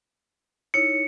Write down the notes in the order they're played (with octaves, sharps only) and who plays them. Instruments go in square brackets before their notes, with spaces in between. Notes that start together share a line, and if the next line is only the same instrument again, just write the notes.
[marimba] D#4 E4 C#5 [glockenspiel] C#7